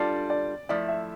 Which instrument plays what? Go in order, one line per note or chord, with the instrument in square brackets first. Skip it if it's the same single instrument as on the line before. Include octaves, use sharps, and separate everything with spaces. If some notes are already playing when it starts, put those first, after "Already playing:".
Already playing: [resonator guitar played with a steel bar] G3 D4 F4 A4 [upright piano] D5
[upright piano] D5
[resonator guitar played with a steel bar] F3 A3 E4 [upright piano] D5
[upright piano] E5